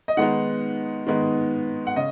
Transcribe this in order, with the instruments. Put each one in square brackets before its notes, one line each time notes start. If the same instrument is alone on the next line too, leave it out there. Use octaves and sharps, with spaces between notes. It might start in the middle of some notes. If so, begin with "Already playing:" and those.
[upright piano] D#5
D#3 G#3 B3 D#4 F#5
D#3 G#3 B3 D#4
F#5
C#3 D#5